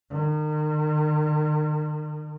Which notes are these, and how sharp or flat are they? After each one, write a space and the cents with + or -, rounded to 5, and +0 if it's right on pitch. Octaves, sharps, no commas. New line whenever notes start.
D#3 -40